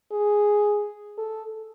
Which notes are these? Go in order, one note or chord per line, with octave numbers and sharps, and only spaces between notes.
G#4
A4